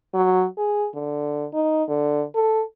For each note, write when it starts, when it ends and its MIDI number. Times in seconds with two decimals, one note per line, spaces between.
0.14 0.45 54
0.58 0.87 68
0.95 1.46 50
1.53 1.83 63
1.89 2.24 50
2.35 2.63 69